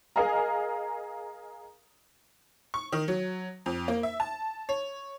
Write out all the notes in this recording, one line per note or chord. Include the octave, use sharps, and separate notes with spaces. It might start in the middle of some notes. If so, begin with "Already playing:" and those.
G#4 A#4 D#5 F5 G#5 A#5
C#6
D#3
F#3
F2
A#3
E5
A5
C#5